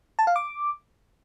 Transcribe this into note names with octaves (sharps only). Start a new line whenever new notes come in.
A5
F5
D6